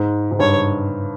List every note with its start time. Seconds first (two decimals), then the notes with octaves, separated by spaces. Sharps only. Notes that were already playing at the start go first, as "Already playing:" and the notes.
Already playing: G#2
0.31 G#2
0.39 G2 C#5